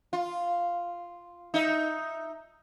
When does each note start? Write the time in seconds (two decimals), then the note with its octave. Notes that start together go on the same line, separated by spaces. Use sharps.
0.13 F4
1.54 D#4 E5